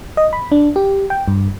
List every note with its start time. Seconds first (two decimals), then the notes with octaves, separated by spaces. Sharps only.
0.17 D#5
0.33 B5
0.52 D4
0.76 G4
1.10 G5
1.28 G2